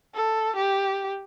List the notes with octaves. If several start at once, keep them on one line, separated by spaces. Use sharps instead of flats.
A4
G4